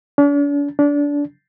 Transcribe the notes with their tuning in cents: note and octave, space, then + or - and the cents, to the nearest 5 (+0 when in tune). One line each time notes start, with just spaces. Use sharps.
D4 -45
D4 -25